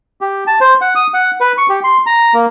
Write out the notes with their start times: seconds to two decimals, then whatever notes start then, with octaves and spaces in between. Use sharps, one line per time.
0.21 G4
0.47 A5
0.61 C5
0.81 F#5
0.95 D#6
1.14 F#5
1.40 B4
1.58 C#6
1.69 G4
1.84 C6
2.06 A#5
2.34 A#3